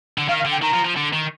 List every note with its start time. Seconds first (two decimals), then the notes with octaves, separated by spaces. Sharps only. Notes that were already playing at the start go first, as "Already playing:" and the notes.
0.18 D3
0.29 D#3 F5
0.40 F5
0.45 D3
0.51 G5
0.62 D#3 A#5
0.73 F3
0.85 F3
0.96 D3
1.13 D#3